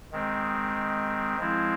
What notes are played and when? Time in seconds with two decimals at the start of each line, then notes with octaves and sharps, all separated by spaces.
0.12 D#3 G#3 C4
1.38 F3 G#3 C4 E4